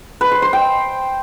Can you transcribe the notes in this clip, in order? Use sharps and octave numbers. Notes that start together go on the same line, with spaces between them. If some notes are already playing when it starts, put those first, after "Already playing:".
B4
C5
C5
G5